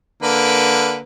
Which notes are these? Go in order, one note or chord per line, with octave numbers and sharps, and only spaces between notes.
D3 A#3 B4